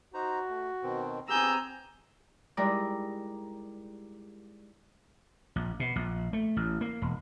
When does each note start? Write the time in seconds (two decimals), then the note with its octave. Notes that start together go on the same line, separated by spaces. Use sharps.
0.14 D#4 F#4 C5 A#5
0.50 A3
0.83 B2 D#3 C4
1.29 B3 C4 G4 G#4 G#5 A#5 E6 G6
2.57 G3 G#3 D#4 E4 A#4 D5
5.56 A#1
5.80 B2
5.96 A#1
6.33 A3
6.57 A1
6.81 A#3
7.02 E1